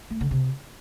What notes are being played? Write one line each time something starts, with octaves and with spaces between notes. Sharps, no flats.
A3
D3
C3